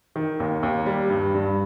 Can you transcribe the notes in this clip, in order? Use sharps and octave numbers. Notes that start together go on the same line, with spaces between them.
D#3
D#2
D#2
G3
G2
G2